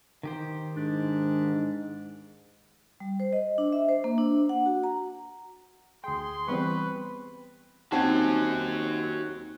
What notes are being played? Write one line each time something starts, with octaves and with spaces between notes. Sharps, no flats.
D#3 G4 C5
G#2 D4
G3
C5
D#5
D4
E5
C5
A#3
D4
F#5
F#4
A#5
D2 G#4 G5 C6
E3 G3 B3 C4 B4 C#6
D#2 C4 C#4 D#4 F#4 F#5 G#5